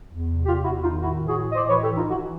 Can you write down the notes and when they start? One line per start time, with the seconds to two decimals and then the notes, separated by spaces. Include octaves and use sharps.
0.10 E2
0.28 C3
0.46 E2 F4 G4
0.64 E2 E4 F#4
0.83 D#3 D#4 F4
1.01 A2 E4 F#4
1.19 A2
1.28 F#4 G#4
1.38 E3
1.51 D#5
1.56 A2 C5 D5
1.69 B4 C#5
1.74 E3
1.83 G4 A4
1.92 E3 D#4 F4
2.10 E3 E4 F#4